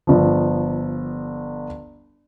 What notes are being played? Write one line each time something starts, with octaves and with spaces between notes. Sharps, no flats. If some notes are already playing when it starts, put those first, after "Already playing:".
G1 F3